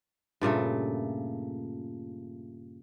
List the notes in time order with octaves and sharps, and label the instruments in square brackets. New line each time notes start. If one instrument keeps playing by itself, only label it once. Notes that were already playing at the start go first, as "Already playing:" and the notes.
[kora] G2 A#2 C#3 A3